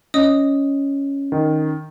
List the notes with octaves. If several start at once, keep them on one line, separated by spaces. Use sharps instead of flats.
C#4 D#5 D#6
D#3